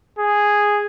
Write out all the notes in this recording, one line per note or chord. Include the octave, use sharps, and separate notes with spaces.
G#4